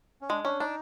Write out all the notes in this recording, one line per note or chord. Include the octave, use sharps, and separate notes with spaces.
C#4
G#3 D4
C#4 D4
D4 D#4